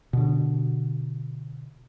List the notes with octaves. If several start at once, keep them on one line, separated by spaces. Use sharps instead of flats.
B2 D3